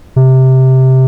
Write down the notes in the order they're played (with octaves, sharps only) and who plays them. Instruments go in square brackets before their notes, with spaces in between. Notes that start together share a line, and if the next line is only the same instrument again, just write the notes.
[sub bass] C3